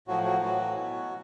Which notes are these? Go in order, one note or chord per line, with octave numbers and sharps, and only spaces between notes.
A2 F3 F#3 F#4
F#3 F#4
A2 E3 F#3 F#4
B2